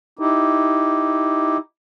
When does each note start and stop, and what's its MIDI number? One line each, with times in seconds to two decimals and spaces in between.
0.19 1.57 63
0.19 1.57 64
0.19 1.57 67